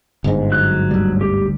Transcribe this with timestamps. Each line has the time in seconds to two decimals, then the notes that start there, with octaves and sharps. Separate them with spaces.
0.24 G1 G#2
0.52 F#3 F#6
0.91 D2 G3
1.21 G4